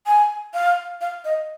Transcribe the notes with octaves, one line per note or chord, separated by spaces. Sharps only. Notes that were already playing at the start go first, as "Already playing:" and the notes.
G#5
F5
F5
D#5